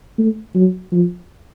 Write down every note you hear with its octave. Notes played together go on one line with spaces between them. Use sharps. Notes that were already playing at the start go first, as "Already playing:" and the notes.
A3
F#3
F3